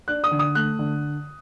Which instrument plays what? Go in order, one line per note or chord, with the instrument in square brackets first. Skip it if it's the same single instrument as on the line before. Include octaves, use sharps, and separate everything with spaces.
[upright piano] D4 F#6
D#6
D3
D#6
A3 F#6
D3